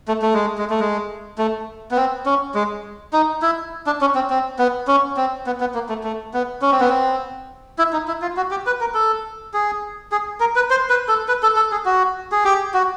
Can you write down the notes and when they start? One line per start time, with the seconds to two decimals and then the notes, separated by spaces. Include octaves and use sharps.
0.08 A3
0.22 A3
0.34 G#3
0.58 G#3
0.70 A3
0.80 G#3
1.38 A3
1.91 B3
1.96 C4
2.26 C#4
2.54 G#3
3.13 D#4
3.42 E4
3.86 D4
4.01 C#4
4.15 C4
4.30 C4
4.59 B3
4.87 C#4
5.17 C4
5.46 B3
5.60 B3
5.74 A#3
5.89 A3
6.03 A3
6.34 B3
6.62 C#4
6.72 C4
6.80 B3
6.89 C4
7.78 E4
7.93 D#4
8.08 E4
8.22 F4
8.37 F#4
8.51 G4
8.66 B4
8.81 A#4
8.94 A4
9.54 G#4
10.12 G#4
10.40 A#4
10.56 B4
10.70 C5
10.90 B4
11.08 A4
11.28 B4
11.43 A4
11.56 A4
11.71 G#4
11.85 F#4
12.32 G#4
12.45 G4
12.74 F#4